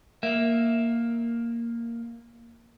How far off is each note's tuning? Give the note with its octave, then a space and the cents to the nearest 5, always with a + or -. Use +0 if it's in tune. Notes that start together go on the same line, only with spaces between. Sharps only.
A#3 +0 E5 +0